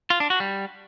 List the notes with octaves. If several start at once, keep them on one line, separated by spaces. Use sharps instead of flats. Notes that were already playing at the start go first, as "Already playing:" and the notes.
F4
D4
F#4
G3